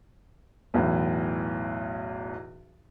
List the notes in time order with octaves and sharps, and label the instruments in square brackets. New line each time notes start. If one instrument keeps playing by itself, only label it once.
[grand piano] B1 E2 A2